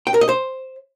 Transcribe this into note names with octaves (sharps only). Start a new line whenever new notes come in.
G5
A#4
D#5
C5